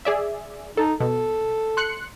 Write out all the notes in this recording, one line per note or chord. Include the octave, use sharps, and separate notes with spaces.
G#4 D5 E5
D#4 A4
B2 A4
C6 F#6 C#7